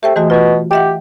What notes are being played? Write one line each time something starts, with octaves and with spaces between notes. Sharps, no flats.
A3 G4 C5 G5
E3 G#3 A3 F#4
B2 F4 F#4
G4 D#5 E5 F#5